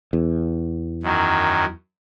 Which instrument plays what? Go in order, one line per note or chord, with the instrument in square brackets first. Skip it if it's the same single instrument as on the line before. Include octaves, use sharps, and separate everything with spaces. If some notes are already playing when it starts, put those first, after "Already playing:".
[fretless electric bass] E2
[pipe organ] F#2 D#3 F#3